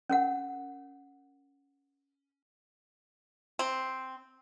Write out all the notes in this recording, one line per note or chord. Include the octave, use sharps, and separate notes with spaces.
C#4 A#4 F#5
C4